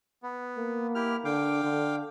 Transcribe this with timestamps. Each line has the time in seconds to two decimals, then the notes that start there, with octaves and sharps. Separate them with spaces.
0.23 B3
0.57 A#3
0.95 E4 G4 F6
1.25 D3 F5 G5 D6
1.64 D3